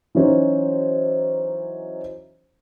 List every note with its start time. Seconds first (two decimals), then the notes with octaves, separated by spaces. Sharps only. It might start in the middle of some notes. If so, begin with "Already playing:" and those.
0.15 E3 F#3 C#4 D#4 C5